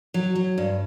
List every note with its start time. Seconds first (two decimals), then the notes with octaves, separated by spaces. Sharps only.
0.14 F#3
0.35 F#3
0.58 G2